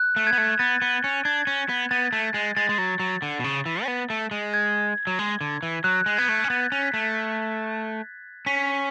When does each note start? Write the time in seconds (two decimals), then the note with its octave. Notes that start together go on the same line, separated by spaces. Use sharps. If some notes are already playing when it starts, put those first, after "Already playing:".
Already playing: F#6
0.16 A3
0.27 G#6
0.33 B3
0.38 A3
0.59 B3 A6
0.82 B3
1.04 C#4
1.25 D4 G#6
1.47 C#4
1.69 B3
1.91 B3 A6
2.12 A3
2.34 G#3
2.57 G#3 A6
2.69 G#3
2.78 F#3
3.00 F#3
3.22 D3
3.39 B2
3.44 C#3
3.66 E3
3.83 C#4
3.88 B3
4.10 A3
4.31 G#3
4.54 G#6
5.07 F#3
5.19 G#3
5.41 D3
5.63 E3
5.84 F#3 F#6
6.06 G#3
6.17 B3 G#6
6.29 A3
6.44 C#4
6.50 B3 A6
6.72 C#4
6.83 B6
6.94 A3
8.46 C#4 B6